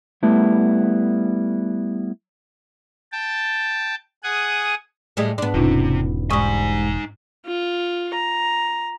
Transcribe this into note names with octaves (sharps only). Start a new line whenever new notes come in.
G3 A3 B3 E4
G5 A5
G#4 F#5 G#5 D#6
A2 G3 G#3
G#2 B3 D4
E1 C3 C#4 D#4 F4
G#2 G3 D#4 G#5 C#6 D#6
F4
A#5